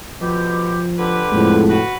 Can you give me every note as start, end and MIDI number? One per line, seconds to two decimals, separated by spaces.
0.21 0.84 47
0.21 0.84 50
0.21 1.24 53
0.21 0.84 67
0.98 1.61 50
0.98 1.61 67
0.98 1.61 71
1.32 1.77 41
1.32 1.77 45
1.32 1.76 56
1.68 1.95 66
1.68 1.95 71